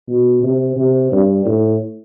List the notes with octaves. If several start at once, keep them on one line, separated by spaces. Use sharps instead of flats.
B2
C3
C3
G2
A2